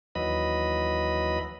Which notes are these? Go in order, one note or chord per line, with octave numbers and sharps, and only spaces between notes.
D#2 E3 F#3 D#5 B5